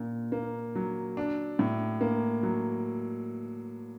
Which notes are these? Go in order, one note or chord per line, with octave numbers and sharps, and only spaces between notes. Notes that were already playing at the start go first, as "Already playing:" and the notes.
Already playing: A#2
A#3
F#3
D4
A2
A#3
F#3